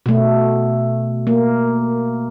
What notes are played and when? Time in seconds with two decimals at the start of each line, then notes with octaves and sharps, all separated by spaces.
0.06 B2 A3
1.27 A#3